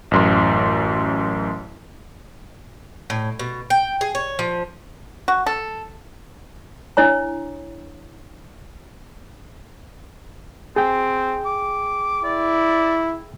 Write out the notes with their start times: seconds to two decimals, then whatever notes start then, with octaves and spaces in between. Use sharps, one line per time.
0.11 A1 F#2 C6
3.10 A2
3.39 B2
3.70 G5
4.01 G#4
4.15 C#5
4.39 F3
5.28 F#4
5.46 A4
6.97 D4 E4 C#5 A#5
10.76 C4 G#4 G5
11.45 D6
12.24 E4 D5